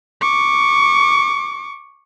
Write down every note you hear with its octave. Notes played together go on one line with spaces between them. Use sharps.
C#6 D6